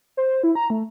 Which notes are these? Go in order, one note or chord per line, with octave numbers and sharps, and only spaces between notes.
C5
E4
A#5
A3